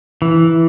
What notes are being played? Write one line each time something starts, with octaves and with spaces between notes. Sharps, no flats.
E3